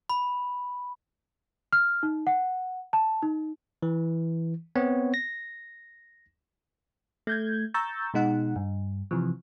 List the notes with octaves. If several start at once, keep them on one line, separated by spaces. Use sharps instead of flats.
B5
F6
D#4
F#5
A5
D#4
E3
B3 C4 C#5
A#6
A3 G6 G#6
A#5 C#6 E6 G6 A6
B2 G#3 D#4 F#5
G2
C3 E3 F3